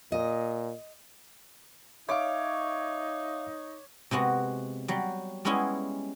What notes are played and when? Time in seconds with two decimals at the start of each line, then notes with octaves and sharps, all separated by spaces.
0.12 A#2 D#5
2.09 D#4 C#5 E5 F5 D6
4.11 C3 G#3 B3 F#4
4.88 F#3 G3
5.45 G3 G#3 B3 C#4 E4 G#4